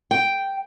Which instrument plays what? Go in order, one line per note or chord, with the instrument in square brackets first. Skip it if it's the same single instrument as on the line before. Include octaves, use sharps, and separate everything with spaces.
[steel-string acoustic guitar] G5